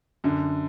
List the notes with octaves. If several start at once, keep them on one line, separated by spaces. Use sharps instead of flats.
F#2 D3